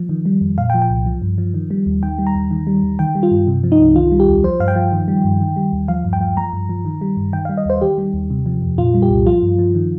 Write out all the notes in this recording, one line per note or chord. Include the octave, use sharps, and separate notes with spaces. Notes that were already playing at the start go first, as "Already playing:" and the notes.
Already playing: F3
D#3
G3
F2
A#2 F5
G5
F3
G5
C2
F3
G2
F3
D#3
G3
D#2
D#3 G5
G3
A#5
D#2
D#3
G3
D#2
D#3 G5
G3
F4
G2
C3
F3
D#4
C2
D#3 F4
G3
G4
D#2
F3 C5
G2 F5
G5
F3
D#3
G3
G2
D#3
G3
D#2
F3 F5
G2
G5
F3
F3 A#5
G2
F3
D#3
G3
G2
D#3 G5
F5
G3
D#5
D#2 C5
D#3 G4
G3
D#2
C3
F3
F2
A#2 F4
G3
G4
C2
F3 F4
G2
F3
D#3